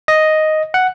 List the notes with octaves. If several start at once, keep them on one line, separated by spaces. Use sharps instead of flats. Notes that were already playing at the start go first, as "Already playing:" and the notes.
D#5
F#5